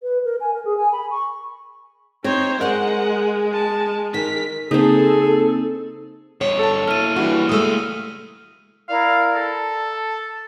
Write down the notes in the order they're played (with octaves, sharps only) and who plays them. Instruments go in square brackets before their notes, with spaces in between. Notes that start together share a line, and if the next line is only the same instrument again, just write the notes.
[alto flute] B4
A#4
G#5
A#4
G#4
G#5
B5
C#6
[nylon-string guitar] C4 [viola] D#4 C5 [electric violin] C#5
[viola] G#3 [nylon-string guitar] A#4 D#5 [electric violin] F#5
[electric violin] A5
[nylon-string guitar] D#3 [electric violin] A#4 B6
[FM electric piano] C#3 A#3 C4 [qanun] D#4 C5 [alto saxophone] G#4 [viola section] A4
[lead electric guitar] G2 B2 [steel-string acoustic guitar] C#5
[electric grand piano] A4 A5
[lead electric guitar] A#3 E4 [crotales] F6 D#7
[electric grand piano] E3 G3 F#4 [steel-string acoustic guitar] D4
[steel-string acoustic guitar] G#3 A3 [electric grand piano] D#6 E6
[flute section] E4 A#4 D5 [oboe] F5
[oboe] A4
[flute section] A5